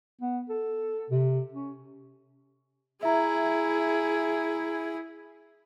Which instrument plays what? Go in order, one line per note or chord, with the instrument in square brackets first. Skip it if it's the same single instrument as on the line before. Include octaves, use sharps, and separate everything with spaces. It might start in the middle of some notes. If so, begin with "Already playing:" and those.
[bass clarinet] B3
A4
C3
C#4
[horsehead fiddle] E4 G#4 [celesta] E5 A#5